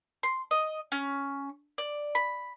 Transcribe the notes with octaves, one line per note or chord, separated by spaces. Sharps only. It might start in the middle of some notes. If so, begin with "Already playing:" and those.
C6
D#5
C#4
D5
B5